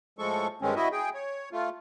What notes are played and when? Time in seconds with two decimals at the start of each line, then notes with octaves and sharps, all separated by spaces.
0.19 A2 F3 G#3 A4 C#6
0.62 G2 D#3 G#3 C4 C#4
0.76 E4 F#4 D#5 E5
0.92 G#4 G5
1.14 C#5
1.52 A3 F4